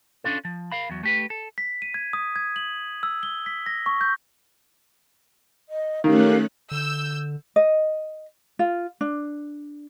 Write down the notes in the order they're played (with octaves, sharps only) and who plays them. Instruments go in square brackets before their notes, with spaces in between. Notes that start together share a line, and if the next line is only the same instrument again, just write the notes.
[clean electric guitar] C#4 D4 F4 A4
F3
A#4 F5 B5
E2 F#3
A3 G4 B4
A4
[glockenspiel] B6
D#7
G#6
D#6
G#6
F#7
E6
G7
B6
A#6
C#6
G6
[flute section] D#5
[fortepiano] D#3 [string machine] A3 C#4 F#6 [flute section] G4 A#4 F5
[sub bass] D3 [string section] E6 G6
[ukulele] D#5
F4
D4